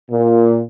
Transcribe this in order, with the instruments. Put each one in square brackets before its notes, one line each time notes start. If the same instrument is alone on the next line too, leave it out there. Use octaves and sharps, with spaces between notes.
[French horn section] A#2